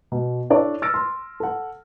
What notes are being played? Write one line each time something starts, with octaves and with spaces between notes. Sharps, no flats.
B2
D4 E4 A4 C#5 D5
E6 F6 A6 A#6 D7
C6
A4 F#5